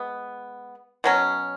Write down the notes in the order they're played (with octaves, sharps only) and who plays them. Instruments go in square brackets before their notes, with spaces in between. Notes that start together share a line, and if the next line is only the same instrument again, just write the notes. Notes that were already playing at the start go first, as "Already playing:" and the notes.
Already playing: [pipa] G#3 B3
B2 F#3 C#4